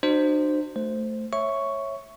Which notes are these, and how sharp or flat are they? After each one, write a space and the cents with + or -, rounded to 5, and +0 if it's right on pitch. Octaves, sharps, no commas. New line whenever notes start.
D4 +45 F#4 +0 C5 +0
A3 +0 C5 +0
C#5 -15 E5 +0 C#6 +5